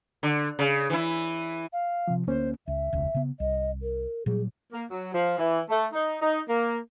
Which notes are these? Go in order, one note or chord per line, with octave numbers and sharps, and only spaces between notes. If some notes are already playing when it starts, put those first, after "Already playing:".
D3
C#3
E3 E4
F5
C3 F3
D2 A#3 C#4 C5
C#2 E5
E1 C#2
C#3 B3
C2 D#5
A#4
A#2 F#3 G3 G#4
A#3
F#3
F3
E3
A3
D#4
D#4
A#3